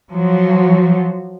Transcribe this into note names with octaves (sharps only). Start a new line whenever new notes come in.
F3 F#3